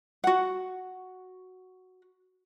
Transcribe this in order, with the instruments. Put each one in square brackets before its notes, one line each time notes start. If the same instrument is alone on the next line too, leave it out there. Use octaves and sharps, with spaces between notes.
[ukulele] F#4 F#5